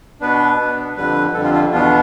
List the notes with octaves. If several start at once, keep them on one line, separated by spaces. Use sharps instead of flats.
B2 B3 D4 B4
B2 B3 D4
F2 D3 G3 B4
F2 D3 G3 A4
F4
F4
E2 B2 B3 D4 F4